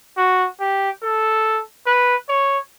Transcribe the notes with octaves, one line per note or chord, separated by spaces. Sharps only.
F#4
G4
A4
B4
C#5